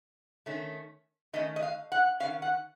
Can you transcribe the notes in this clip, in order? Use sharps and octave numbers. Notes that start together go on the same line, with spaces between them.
D#3 A3 C#4
D#3 A3 C#4 D#5
D#5
F5
F#5
D#3 A3 C#4 F5
F#5